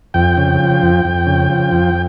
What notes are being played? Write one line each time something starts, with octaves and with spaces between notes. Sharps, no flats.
F2 G5
C#3
F3
F2
F2
C#3
F3
F2